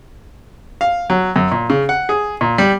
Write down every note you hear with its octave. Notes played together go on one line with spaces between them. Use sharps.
F5
F#3
F#2
A#2
C#3
F#5
G#4
A#2
G3